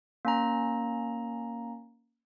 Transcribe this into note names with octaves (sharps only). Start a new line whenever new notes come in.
A#3 C#4 A#5